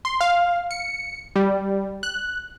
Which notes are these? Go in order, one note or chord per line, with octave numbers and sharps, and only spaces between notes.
C6
F5
C#7
G3
F#6